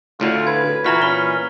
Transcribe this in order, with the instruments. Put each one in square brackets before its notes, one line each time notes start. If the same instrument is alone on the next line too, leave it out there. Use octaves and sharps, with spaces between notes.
[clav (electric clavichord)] D2 A2 D3 [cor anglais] F4
[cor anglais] B4 [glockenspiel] G#6
[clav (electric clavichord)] A#2 E3 [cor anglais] F#4 [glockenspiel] A#5 F6 B6
[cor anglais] C#4 [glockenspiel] B5 G7